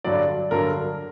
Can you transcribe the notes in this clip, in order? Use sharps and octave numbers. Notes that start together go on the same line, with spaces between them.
G2 D3 F#3 D5
G2 D3 F#3 A#4